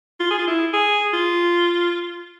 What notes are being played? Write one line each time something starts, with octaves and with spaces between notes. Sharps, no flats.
F4
G#4
F4
E4
G#4
F4